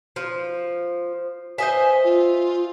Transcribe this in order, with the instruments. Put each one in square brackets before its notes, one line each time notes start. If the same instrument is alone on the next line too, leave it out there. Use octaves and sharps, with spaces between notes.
[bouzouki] F3
[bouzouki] C5 D#5 E5 [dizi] G#5
[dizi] F4